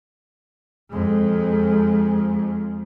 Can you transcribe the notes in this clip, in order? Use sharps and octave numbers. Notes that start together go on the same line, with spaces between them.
F2 G#3